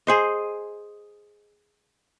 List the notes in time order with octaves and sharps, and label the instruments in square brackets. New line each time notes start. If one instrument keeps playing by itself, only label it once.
[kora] G#4 C5 D#5